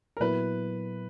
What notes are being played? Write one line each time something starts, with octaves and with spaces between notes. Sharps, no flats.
A#4
A#2 F#3 B3 E4 B4